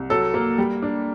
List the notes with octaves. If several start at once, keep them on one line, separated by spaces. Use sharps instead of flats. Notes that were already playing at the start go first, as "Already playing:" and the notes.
Already playing: C2
F#3 A4
A#3
G3
D4